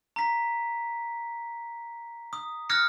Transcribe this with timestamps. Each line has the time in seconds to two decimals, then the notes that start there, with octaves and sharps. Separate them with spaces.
0.16 A#5 B6
2.33 D#6
2.70 D#6 F6 F#6 G#6 A#6 C#7